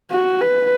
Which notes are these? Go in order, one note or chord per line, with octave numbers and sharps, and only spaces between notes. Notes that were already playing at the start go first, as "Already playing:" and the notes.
F#4
B4